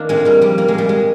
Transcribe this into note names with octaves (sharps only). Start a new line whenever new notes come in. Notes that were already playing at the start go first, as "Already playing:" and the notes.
Already playing: D#3 A#3 D4 F4
A#2 G#3 C4
G3 A#3
F3 G3
A#3
G#3
A#2 G3
G#3